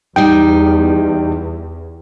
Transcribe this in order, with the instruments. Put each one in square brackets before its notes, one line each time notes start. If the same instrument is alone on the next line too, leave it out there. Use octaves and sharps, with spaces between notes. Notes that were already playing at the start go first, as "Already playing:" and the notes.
[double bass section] E2 [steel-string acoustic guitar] G3 D#4 D#5 [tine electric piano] G5